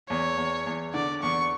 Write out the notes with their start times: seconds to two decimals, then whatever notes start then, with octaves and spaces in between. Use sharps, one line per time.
0.09 E2 C#5
0.38 E2
0.67 E2
0.94 D3 D5
1.22 E2 C#6